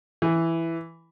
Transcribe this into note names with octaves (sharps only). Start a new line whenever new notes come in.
E3